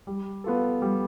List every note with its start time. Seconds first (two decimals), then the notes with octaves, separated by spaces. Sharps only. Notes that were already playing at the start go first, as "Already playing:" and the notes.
0.07 G3
0.44 B3 F4 A4
0.82 G3